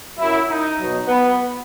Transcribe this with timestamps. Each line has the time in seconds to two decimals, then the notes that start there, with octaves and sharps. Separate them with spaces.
0.19 F#2 F#3 E4
0.49 D#4
0.79 B2 F#3
1.08 B3